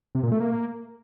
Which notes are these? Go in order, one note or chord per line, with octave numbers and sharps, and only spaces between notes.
C3
A#2
A3
A#3